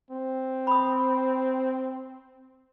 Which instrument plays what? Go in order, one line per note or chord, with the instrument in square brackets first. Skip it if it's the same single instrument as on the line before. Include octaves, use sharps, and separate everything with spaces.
[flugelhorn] C4
[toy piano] B5 D#6